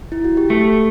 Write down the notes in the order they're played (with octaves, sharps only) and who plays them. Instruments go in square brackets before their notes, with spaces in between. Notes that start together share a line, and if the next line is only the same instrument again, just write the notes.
[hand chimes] E4
F#4
G4
[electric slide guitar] A3 [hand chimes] A4